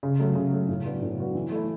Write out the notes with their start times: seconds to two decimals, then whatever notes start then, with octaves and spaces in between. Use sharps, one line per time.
0.03 C#3
0.20 F#3 A3
0.35 C#3
0.52 F#3 A3
0.69 A2
0.85 F#3 B3 D4 F#4
1.02 A2
1.18 F#3 B3 D4 F#4
1.35 E3
1.52 A3 E4